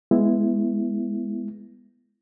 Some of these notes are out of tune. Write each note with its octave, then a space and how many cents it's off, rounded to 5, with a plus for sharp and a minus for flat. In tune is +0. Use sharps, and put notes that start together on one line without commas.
G#3 +0 B3 +0 E4 +5